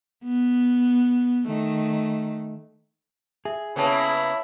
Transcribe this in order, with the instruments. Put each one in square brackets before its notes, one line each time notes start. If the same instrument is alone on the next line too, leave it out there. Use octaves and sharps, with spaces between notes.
[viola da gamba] B3
D#3 A3
[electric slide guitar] G#4 [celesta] E5
[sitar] C#3 A#3 B3 [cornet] E4 [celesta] C#5 A5